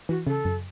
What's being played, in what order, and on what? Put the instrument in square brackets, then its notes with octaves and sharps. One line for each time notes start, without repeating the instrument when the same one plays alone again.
[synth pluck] E3 [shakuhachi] F#4
[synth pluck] C#3 [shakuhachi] A4
[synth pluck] F#2